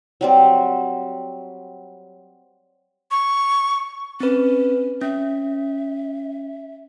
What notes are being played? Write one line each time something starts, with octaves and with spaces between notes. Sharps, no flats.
F#3 G3 C4
C#6
C4 C#4 B4
C#4 E5